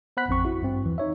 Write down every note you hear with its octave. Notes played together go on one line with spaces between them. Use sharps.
B3 C5 F#5 B5 F#6 B6
A1 F2 C4 C#6
E4 F#4
G2 C4
E2 E3
D#4 C#5 E5